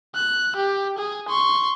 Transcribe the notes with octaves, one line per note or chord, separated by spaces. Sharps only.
F#6
G4
G#4
C6 C#6